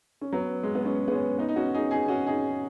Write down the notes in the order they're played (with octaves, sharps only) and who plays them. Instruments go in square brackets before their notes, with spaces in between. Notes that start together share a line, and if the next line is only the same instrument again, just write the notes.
[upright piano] C#4
F#3 B3
G#3
B3
G#3 C#4
B3
G#3 C#4
B3 D#4
D#4
C#4 F#4
D#4 G#4
D#4 G#4
C#4 F#4
D#4 G#4